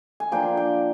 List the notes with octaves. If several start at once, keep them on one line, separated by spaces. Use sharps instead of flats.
G#5
F3 A#3 D4 F4 G5
G5